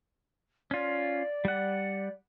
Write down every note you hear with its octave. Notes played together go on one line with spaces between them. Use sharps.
C#4 F4 D5
G3 F#5